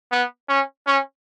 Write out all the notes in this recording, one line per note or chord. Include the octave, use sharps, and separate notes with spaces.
B3
C#4
C#4